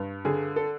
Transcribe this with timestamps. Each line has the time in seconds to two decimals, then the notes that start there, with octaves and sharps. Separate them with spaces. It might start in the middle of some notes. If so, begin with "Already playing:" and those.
Already playing: G2
0.25 D3 G#4
0.56 A4